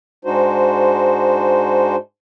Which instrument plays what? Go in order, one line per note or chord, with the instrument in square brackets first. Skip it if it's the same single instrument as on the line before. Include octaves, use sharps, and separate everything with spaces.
[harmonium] G#2 G#3 D4 D#4 F#4 C5